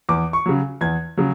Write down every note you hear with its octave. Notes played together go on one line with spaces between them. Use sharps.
E2 D6
C#6
C#3 F#3
E2 G#6
C#3 F#3